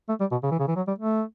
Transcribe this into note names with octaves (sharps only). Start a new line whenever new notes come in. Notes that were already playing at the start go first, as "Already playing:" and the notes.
A3
G3
B2
C#3
E3
C#3
E3
F#3
G3
A3